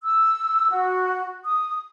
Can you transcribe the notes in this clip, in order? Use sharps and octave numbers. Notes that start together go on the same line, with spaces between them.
E6
F#4
D#6